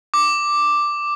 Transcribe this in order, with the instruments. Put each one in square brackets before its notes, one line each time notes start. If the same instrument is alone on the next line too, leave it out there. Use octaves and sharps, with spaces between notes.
[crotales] D6